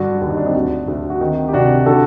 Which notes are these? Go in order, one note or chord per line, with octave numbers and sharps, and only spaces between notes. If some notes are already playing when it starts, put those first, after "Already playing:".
Already playing: G2 D3 D4 F#4
D#2 F#4
D#4
D4
C4 D#4
D2 D4 F#4
D2
F#4
D#3 C4 D#4
G4
C3 D4 F#4
D3 F#4 A4